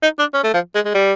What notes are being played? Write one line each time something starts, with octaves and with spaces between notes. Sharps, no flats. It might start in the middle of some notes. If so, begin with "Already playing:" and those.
D#4
D4
C#4
A3
F3
G#3
G#3
G3